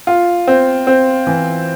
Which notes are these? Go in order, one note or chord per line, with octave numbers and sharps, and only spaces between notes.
F4
C4
C4
E3